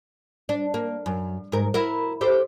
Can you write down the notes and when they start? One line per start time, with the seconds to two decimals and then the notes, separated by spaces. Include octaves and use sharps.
0.49 D4
0.74 A#3
1.06 F#2
1.52 G#2 A#4
1.74 E4 F#4 A#4
2.21 G4 A4 C5